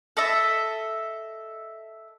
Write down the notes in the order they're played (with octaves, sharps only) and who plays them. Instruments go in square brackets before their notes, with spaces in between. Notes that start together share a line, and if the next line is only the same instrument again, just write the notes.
[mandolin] A4 D#5 E5